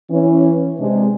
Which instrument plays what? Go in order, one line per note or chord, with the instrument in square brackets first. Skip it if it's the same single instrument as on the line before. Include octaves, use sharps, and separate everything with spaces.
[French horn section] E3 C#4
C3 G#3 D4